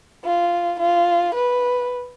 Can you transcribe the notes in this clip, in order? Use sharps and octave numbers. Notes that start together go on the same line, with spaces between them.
F4
F4
B4